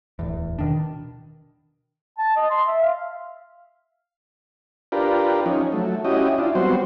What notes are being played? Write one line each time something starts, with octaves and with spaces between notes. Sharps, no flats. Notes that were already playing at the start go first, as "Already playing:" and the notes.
D1 E2
B2 D#3 D4
A5
D#5
C6
E5
F5
D4 F4 G4 A#4 B4
F3 C#4 D#4
F#3 A3
C#4 E4 F#4 G4 D#5
D4 E4 F4
F#3 G3 B3 C4 F#4 C5